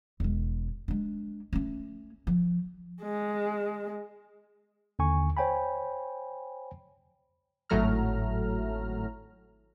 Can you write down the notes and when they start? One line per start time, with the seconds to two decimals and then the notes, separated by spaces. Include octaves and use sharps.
0.20 E1 G#3
0.88 G#3 D4
1.53 A3 C#4
2.27 F3
3.03 G#3
4.99 D#2 D3 G#5 C#6
5.37 C5 C#5 G5 G#5 B5
7.70 G#1 A2 F#3 A3 A#5 F6